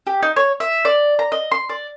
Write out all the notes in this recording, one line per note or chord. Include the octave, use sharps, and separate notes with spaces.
G4
D#4
C#5
E5
D5
A#5
D#5
C6
D5